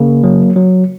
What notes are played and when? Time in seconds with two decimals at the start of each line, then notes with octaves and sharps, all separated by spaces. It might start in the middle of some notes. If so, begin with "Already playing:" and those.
Already playing: C#3 A#3
0.24 F#3
0.56 F#3